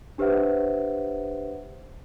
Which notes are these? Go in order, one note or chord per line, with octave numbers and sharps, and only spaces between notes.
D4 G4 B4 C5 E5 F#5